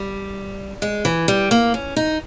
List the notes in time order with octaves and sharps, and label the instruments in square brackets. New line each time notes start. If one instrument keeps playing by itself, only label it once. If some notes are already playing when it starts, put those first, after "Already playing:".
Already playing: [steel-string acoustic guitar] G3
G#3
E3
G3
A#3
C#4
D#4